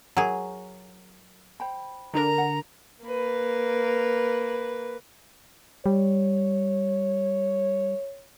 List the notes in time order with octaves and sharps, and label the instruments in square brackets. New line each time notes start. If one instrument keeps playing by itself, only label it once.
[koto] F#3 G#4 [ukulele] A#4 A#5
[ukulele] C5 G5 B5
[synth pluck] D3 D4 A#4 [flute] A#5
[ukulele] F#5
[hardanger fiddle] A#3 B4
[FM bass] G3 [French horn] C#5